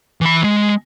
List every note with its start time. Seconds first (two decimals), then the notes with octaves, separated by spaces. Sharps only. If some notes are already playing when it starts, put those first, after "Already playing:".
0.21 E3 B5
0.44 G#3